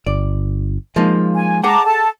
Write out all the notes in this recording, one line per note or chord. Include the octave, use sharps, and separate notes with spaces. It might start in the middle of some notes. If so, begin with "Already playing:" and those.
G1 D5
F3 G#3 A#3 D#4
G#5
G#4 F#5 G5 A5 A#5 D6
A4 A5